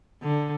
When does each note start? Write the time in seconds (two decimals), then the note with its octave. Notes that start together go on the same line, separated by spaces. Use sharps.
0.22 D3